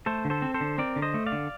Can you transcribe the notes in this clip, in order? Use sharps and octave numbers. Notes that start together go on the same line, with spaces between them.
A3 A4 C5
D3
A4 C5
C4
A4 C5
D3
C4 A#4 D5
D3
C5 D#5
A3
D5 F5
D3